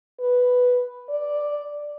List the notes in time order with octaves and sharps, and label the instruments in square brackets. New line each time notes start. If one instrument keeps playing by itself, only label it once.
[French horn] B4
D5